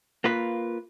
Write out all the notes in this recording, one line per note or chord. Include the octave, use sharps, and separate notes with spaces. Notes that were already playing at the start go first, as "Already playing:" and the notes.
A#3 F4 B4